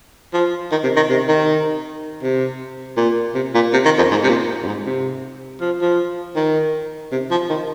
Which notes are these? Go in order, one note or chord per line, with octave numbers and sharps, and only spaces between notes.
F3
D#3
C3
D#3
C3
D#3
C3
A#2
C3
A#2
C3
D#3
F2
G#2
C3
A#2
F2
G#2
C3
F3
F3
D#3
C3
F3
D#3